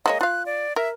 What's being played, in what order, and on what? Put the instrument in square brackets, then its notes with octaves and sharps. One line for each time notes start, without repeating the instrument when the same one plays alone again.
[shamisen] G#3 A#3 C#5 [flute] D#5
[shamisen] F4 F5 [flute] F#6
[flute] D5
[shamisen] A#4 [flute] E5